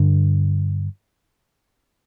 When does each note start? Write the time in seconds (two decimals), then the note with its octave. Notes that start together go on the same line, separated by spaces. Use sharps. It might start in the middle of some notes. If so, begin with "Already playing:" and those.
Already playing: G2 D3